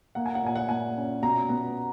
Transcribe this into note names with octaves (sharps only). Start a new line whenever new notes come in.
A#3 F#5
G#5
F#5
A#2 G#5
F#5
A#2 G#5
C#4
B2 A#5
B3